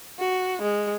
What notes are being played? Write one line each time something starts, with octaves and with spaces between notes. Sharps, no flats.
F#4
G#3